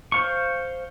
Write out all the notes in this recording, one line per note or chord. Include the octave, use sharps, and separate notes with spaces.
C5 F5 C#6